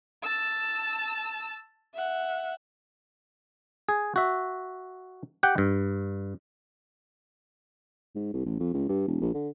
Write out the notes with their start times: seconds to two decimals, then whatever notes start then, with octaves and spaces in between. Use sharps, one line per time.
0.23 A5 E6
1.94 E5 F#5
3.89 G#4
4.16 F#4 E5
5.43 G4 F#5 G5
5.58 G2
8.15 G#2
8.33 C2
8.46 A1
8.60 F2
8.74 C#2
8.89 G2
9.08 E1
9.21 A#1
9.34 D3